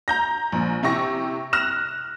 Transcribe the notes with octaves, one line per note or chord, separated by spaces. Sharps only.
A#5 G6 A#6
A#1
C3 E4 G4 C#6 A#6
F6 F#6 A#6 E7